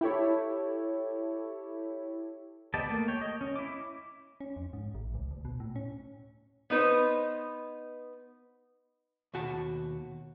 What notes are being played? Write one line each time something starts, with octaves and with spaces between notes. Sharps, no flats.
E4 G4 A4 C#5
B3 G4 D5 D#5 A5
A3 A#3
C#5 G5
D#5
C#4
E4 D6
C#4
F2
G#2
A1
C#2
D2
B2
A2
C#4
B3 D#4 B4 C5
D#2 B2 F#4 A5